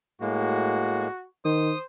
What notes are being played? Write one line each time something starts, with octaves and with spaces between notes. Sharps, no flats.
A2 G#3 A#3 F#4
D#3 C5 D#6